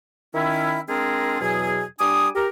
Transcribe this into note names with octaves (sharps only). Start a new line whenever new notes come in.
D#3 C#4 E4
G#3 C4 D4 F4 G#4 A#4
E2 B2 F#3 G#4
G3 D4 G#5 D6 D#6
G4 A#4